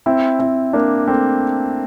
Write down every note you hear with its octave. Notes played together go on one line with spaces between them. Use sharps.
C4 E4
C4 E4
A#3 D4
A3 C4